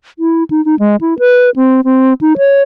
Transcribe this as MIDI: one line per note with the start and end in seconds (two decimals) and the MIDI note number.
0.19 0.44 64
0.50 0.63 63
0.65 0.75 63
0.79 0.96 56
1.01 1.18 64
1.19 1.50 71
1.56 1.81 60
1.84 2.14 60
2.21 2.37 63
2.38 2.62 73